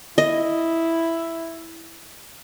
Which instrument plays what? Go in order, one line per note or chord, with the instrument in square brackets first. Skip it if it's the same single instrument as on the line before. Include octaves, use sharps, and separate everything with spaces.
[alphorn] E4 [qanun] D#5